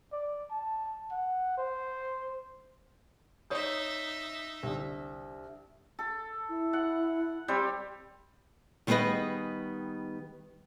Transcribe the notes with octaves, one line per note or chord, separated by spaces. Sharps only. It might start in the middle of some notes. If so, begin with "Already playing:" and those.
D5
A5
F#5
C5
D#4 C#5 E5 D#6 G6
C2 D3
A4
E4
F#5
G3 C4 G4
D#3 G3 B3 G#4 B4 D#5